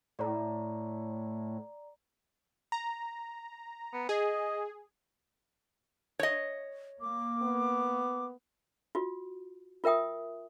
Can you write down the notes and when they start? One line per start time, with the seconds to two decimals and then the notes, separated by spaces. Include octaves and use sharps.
0.19 A2 D5 A#5
2.72 A#5
3.93 B3
4.09 G#4 D#5
6.19 C#5 D#5
7.01 A#3 D6
7.42 B3
8.95 F4 F#4
9.84 F4 A#4 E5 G5 D#6